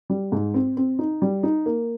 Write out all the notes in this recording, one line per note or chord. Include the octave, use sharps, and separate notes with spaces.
G3
G#2
C4
C4
D#4
G3
D#4
A#3